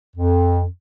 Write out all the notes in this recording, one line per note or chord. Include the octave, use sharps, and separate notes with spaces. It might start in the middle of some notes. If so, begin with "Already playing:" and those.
F2